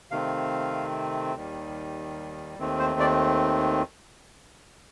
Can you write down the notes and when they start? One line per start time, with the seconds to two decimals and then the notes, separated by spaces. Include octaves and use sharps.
0.11 C3 D#3 A3 C4 F5
1.35 D#2 D#3 G3
2.59 D#2 D#3 A3 C4
2.80 C5
3.00 D5